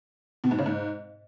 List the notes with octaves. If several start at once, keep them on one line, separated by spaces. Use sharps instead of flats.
B2
G#2
C#3
G#2